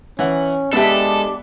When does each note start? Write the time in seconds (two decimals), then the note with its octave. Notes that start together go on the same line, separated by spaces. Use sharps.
0.19 E3 C#4 F#5
0.73 G#3 B3 D4 G4 A4 E5